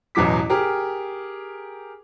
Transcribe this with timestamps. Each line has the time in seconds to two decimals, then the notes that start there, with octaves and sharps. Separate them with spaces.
0.15 A1 E2 B2 F#3 D6 B6
0.50 G4 G#4 A#4